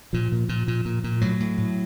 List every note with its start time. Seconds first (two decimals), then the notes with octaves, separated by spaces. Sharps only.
0.13 A#2 F3
0.32 A#2
0.49 A#2
0.68 A#2
0.85 A#2
1.04 A#2
1.21 A2 F#3
1.40 A2
1.58 A2